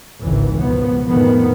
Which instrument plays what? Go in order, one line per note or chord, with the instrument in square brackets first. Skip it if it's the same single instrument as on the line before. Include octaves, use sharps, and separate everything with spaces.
[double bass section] G#1 C#2 E3
C#2 B2 F3 B3
F2 A2 D#3 F3 B3